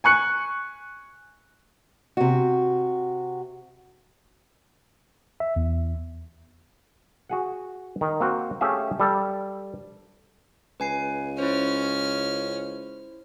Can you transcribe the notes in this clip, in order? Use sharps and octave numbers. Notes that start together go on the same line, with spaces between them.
G#5 C#6 F#6 C#7
C3 F#4
E5
E2
F#4 G#4 F#5
D#3
A#3 C4 F#4 G5
A3 C#4 G4 G#4 E5 F5
G3 A4
C#2 B4 G#5 C7
C#4 E4 C5 F6